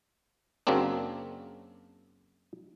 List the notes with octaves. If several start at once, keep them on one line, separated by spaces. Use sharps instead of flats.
F#2 C#3 F#3 A#3 C4 D4